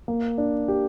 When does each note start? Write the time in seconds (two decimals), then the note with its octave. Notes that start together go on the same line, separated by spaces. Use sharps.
0.08 A#3
0.38 D4
0.68 G4